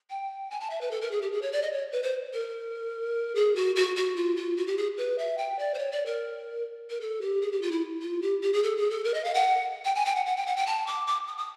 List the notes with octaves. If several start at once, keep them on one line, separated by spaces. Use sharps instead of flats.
G5
G#5
A5
E5
B4
A4
A#4
G#4
G4
G#4
C#5
D5
D#5
C#5
B4
C5
A#4
G#4
F#4
F#4
F#4
F4
F4
F#4
G4
G#4
B4
E5
G5
D5
C5
C#5
D5
A#4
A#4
A4
G4
G#4
G4
F4
E4
F4
G4
G4
G#4
A4
G#4
A4
A#4
D#5
F5
F#5
G5
G#5
G5
F#5
F#5
G5
F#5
G5
A5
D6
D6
D#6
D#6